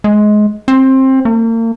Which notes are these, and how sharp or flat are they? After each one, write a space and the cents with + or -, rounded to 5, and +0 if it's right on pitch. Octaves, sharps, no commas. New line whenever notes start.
G#3 +20
C4 +20
A#3 -40